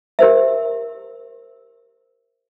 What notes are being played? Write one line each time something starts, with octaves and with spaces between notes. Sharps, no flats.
G4 A#4 C5 E5